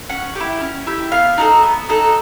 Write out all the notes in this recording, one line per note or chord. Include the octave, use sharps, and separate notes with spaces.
C#4 F#5
E4 G4
C#4
E4 G4
B3 F5
D#4 F#4 A4
B3
D#4 F#4 A4